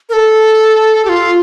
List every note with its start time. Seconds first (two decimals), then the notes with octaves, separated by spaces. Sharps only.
0.09 A#4
0.13 A4
1.05 G4
1.09 F4